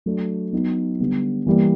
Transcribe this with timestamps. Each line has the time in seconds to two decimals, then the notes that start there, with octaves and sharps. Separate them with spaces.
0.06 F#3 A3 D4
0.53 F#3 B3 D#4
1.00 D3 G3 B3
1.47 E3 G3 A#3